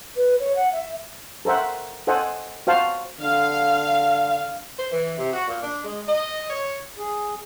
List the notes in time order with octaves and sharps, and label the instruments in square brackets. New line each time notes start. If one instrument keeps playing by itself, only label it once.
[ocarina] B4
C#5
F#5
E5
[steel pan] A4 A#4 C5 E5 F#5
A4 C5 D#5 F#5 G#5
F#4 C5 F5 A5
[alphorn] D3 [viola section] F5
[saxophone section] C5
E3
C3
F#4
A#2
D4
G#3
D#5
C#5
[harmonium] G#4